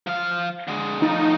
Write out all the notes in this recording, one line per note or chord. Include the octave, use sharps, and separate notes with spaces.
F3 F5
D3 G#3
A2 F3 D#4